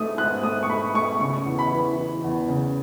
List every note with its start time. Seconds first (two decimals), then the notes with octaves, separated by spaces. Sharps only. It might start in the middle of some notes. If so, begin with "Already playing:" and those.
Already playing: G#2 A3 D#6
0.17 G#2 F#6
0.43 A3 D#6
0.63 C#6
0.70 A3 B5
0.94 A3 C#6
1.20 C#3 C#6
1.46 E2
1.59 B5
1.71 E3
1.97 E3
2.24 E2
2.48 C#3